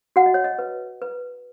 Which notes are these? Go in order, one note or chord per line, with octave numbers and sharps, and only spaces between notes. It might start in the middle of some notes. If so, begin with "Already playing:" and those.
F#4 F#5
D#5
C#5
D#5
B4
B4